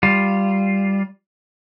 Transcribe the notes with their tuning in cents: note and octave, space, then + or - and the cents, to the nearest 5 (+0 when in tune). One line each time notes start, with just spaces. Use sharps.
G3 +0 F4 +0